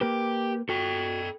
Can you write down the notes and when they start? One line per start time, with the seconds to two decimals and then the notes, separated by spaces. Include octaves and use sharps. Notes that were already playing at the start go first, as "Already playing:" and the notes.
0.01 A#3 G4 A#4 B4
0.69 F#4 A4 G5